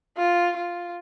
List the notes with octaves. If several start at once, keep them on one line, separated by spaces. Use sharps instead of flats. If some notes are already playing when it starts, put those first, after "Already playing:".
F4
F4